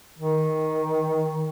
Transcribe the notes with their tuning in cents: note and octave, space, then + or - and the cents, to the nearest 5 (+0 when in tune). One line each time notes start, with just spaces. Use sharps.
D#3 +10